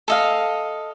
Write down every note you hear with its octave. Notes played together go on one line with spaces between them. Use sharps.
A4 D#5 F5